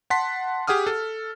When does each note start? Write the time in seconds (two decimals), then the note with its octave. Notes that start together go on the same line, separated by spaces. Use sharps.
0.10 F#5 A5 C6 B6
0.67 G4 G#4 F#5 D#6 F6
0.86 A4